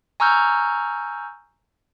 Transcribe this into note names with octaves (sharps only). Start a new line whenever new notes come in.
G#5 A#5 C#6 E6 F6 G6